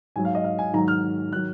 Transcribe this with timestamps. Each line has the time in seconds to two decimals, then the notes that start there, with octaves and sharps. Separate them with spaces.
0.16 G#2 F#3 G#5
0.25 F5
0.35 D#5
0.44 F5
0.59 G#5
0.73 G#2 D#3 F#3 A#5
0.88 F6
1.33 D#3 F#3 F#6